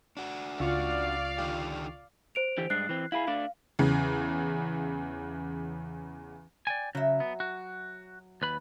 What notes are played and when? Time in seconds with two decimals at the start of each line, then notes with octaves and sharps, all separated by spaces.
0.17 D4 F#4
0.60 C#2 F4 D5 F5 C#6
1.38 D3 D#3 G4
2.35 C5 D7 F7
2.58 D3 E3 G4
2.70 G2 G#3 D4 F#6 C7
2.89 E3 C4
3.12 E4 G4 G#4 F5 B5
3.27 A3 D4 D5 F5
3.79 E2 C#3
6.67 D5 G5 G#5
6.95 C#3 F#3 E5
7.20 B3
7.40 F#4
8.42 D#2 B4 B5